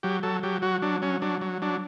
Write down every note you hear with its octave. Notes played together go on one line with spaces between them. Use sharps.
F#3 G4
F#3 A4
F#3 G4
F#3 F#4
F#3 D4
F#3 C#4
F#3 D4
F#3
F#3 D4